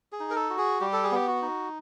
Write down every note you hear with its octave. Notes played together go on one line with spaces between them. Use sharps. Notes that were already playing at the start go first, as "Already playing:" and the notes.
G#4
D#4
A#4
A4
F#4
G#4
G3 G4
A4
G#4
B3 G4
F#4
D#4